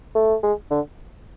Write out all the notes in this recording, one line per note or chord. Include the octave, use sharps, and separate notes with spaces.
A3
G#3
D3